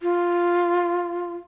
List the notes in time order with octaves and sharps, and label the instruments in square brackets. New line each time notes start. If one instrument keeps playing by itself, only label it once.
[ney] F4